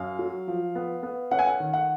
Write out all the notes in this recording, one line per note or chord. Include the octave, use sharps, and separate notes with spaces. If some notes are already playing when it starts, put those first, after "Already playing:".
Already playing: F#2 F5
F#3
F3
B3
B3
C#4 F#5
G#5
F#5
D#3
F#5